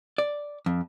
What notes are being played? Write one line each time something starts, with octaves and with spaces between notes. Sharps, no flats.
D5
F2